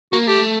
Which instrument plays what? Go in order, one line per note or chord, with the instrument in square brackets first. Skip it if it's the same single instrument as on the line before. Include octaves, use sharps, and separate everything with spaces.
[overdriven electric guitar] A#3 [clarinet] F#4
[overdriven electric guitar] A3 [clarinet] G4